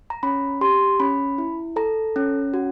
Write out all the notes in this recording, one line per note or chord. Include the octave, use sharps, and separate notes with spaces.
A#5
C#4 B5
G4 C6
C#4 B5
E4
A4 A#5
C#4
F#4